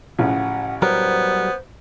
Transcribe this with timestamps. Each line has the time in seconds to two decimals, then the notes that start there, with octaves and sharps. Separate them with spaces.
0.19 A1 C#3 F3 F#5
0.82 F#3 G3 B3 A#4 C5